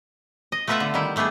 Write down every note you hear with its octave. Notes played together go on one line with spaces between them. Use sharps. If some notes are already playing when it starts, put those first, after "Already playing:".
D#5
A3 B3 F4 B4 E5 F#5
D3
D#3 G3 E4
G3 A3 B3 D4 G#4